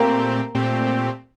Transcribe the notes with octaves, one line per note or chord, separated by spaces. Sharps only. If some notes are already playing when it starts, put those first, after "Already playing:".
Already playing: A#2 A3 A#3 C4 G4
A#2 A3 C4 G4